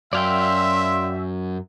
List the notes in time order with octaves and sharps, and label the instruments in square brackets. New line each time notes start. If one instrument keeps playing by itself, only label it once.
[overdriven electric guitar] F#2 [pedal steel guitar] D5 F5 G5 [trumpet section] E5 [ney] C6